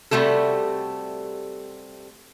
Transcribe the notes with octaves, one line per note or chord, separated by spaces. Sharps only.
C3 G3 A3 F#4 A4